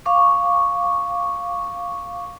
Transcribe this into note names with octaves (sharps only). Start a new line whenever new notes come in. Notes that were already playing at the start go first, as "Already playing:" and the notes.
F5 C#6 D6